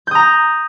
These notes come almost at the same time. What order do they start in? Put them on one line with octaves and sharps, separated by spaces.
G6 D#6 A#5